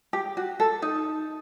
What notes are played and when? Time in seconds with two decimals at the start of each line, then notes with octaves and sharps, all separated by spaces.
0.13 G4
0.37 F#4
0.60 A4
0.82 D#4